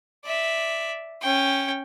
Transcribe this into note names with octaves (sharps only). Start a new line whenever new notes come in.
D5 E5
C#4 G5